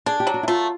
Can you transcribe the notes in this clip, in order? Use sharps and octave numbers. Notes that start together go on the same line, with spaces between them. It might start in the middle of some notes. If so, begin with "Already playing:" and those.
D4 G#4
G4
F#3
F#4
E4
A3 F4